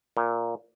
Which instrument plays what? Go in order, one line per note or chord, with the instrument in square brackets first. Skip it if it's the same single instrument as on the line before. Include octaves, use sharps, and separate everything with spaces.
[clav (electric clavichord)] A#2